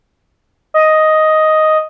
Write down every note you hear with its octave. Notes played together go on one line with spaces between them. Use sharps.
D#5